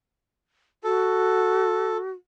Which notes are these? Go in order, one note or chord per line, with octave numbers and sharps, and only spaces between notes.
F#4 A4